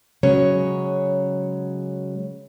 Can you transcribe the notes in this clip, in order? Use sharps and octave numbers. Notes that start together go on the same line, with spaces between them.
C#3 F#3 G#3 C#4 C#5